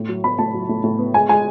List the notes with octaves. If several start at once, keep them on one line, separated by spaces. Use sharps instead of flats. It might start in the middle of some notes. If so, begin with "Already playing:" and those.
Already playing: A2
F#3
B3 B5
A2 A5
F#3
A2
A2
B3
G#3 G#5
G#3 G#5